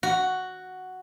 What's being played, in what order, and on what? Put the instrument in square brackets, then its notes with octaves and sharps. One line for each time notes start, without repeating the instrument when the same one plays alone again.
[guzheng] F#4